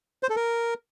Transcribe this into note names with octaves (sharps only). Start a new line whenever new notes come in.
C5
A4
A#4